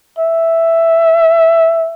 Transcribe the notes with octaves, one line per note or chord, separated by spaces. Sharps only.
E5